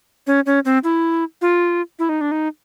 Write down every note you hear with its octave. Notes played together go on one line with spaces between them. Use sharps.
C#4
C#4
C4
E4
F4
E4
D#4
D4
D#4